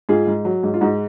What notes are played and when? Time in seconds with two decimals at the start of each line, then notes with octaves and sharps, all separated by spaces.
0.09 G#2 F4 G#4
0.27 G#2
0.45 F#3
0.63 G#2
0.74 F4
0.81 G#2 D#4 F#4